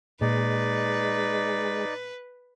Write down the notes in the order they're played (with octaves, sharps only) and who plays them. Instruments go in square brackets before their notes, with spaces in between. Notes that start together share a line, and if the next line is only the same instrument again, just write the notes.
[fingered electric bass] A#2 [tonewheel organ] G#3 [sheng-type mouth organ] D#4 D5 [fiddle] B4